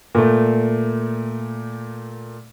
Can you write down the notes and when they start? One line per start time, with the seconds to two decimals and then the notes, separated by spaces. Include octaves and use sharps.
0.15 A#2 A3